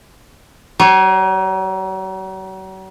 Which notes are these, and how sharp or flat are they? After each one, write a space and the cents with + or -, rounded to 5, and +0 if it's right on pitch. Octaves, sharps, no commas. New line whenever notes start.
F#3 +45 C#5 -15